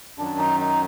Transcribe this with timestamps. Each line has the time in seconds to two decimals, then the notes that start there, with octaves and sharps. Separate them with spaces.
0.18 F#2 D#3 F#3 D4
0.38 D#4
0.60 D#4